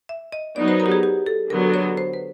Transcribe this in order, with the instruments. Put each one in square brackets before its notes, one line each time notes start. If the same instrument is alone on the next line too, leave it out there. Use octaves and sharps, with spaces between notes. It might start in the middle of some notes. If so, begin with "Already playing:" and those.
[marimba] E5
D#5
[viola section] F#3 B3 D#4 [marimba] D5
[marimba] C5
A#4
G4
G#4
G4
A4
[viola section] D3 F#3 B3 [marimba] A#4
[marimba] C#5
C5
B4